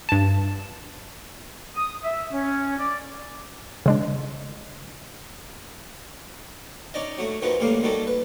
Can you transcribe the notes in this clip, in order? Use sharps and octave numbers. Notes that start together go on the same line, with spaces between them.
G2 A5
D#6
E5
C#4
D5
C#3 G#3 D4
C#4 D#4 D5 D#5
F#3 A3
D#3 F3 F#3 B4
A1 A2 G3 A#3 F5
D#3 F#3 G3 A4
B4